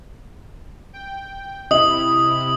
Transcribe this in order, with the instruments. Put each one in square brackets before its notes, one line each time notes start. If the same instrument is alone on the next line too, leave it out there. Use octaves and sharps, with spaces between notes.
[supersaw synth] G5
[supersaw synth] C3 E4 [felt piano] D#5 [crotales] D#6 F#7